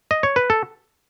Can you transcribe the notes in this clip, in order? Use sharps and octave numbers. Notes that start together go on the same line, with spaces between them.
D#5
C#5
B4
A4